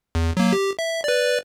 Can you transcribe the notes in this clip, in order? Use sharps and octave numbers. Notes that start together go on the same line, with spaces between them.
E2
F#3 A#3
G4
E5
B4 D5